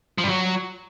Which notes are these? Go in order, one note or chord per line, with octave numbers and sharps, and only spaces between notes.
F3
G2
F#3